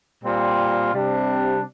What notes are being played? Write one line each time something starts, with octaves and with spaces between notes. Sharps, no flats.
A#2 G3 C4 F4
C3 G3 D4